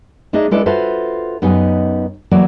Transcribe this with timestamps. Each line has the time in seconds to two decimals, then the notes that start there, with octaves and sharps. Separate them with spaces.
0.33 A3 D4 D#4 G#4 D#5 E5
0.51 G#3 C#4 E4 A4 B4 D5
0.66 F4 F#4 A4 B4 C5 E5
1.42 F#2 B3 D#4 G4 D#5 G#5
2.31 E3 F#3 A3 A#3 F#4 D5